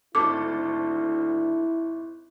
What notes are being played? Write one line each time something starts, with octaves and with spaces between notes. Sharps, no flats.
G#1 D2 E4 A4 D6